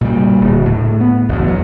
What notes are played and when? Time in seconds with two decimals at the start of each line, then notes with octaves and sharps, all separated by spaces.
0.01 A#2 C#3 G3
0.41 D1
0.65 A2
1.00 B3
1.29 F#1 E2
1.47 F#3